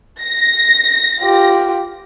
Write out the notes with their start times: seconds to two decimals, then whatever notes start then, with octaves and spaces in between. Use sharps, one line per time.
0.22 A#6
1.21 F4 G4